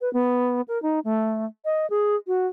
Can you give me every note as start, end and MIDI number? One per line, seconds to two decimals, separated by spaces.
0.01 0.12 71
0.13 0.61 59
0.68 0.81 70
0.82 1.00 63
1.04 1.45 57
1.65 1.89 75
1.90 2.16 68
2.27 2.47 66